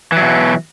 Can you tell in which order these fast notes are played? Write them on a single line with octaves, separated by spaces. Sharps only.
E3 F#3 B2